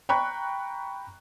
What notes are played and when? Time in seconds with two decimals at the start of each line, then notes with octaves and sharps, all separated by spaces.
0.09 G5 A#5 B5 C#6 F#6